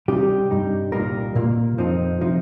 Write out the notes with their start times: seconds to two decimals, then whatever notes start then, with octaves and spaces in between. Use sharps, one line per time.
0.08 C2 C3 G3 D#4 G4
0.51 G2 G3 D#4
0.92 C2 A#2 G3 A#3 D#4 A#4
1.35 A#2 A#3 F4
1.78 F2 F3 C4 D#4
2.21 C3 F3 D#4